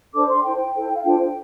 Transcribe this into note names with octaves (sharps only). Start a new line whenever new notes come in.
D4 A4 C5 D6
C6
E4 A4 C5 G5
E4 A4 C5
F5
D4 F4 A4 C5 G5